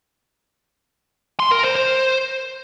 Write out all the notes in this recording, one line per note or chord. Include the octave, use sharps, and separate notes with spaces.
C6
A#4
C5
C5